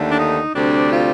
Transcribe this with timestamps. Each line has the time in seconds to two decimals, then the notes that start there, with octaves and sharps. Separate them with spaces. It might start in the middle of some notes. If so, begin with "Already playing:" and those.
Already playing: D#2 D3 A3
0.09 D4
0.18 D#4
0.54 D2 C3 G3 C4 D4
0.92 F4